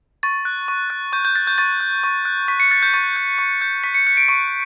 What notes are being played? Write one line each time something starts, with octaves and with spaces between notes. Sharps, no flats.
C#6 A6
F#6
C#6
F#6
C#6 G6
G6
F#6 A6
G6
C#6 A6
F#6
C#6
F#6
C#6 B6
C#7
F#6 A6
G6
C#6 A6
G6
C#6
G6
C#6 B6
C#7
F#6 C#7
D7
C#6